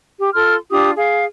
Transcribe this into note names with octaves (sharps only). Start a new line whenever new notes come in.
G4
F4 A4 C6 F6
D4 F4 G4 D#6
G#4 F5